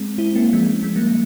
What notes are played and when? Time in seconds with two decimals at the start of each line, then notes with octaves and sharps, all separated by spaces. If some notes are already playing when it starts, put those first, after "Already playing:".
Already playing: G#3 C4
0.18 C4 E4
0.36 A#3 C#4
0.53 F3 G#3
0.83 F3 G#3
0.96 G3 A#3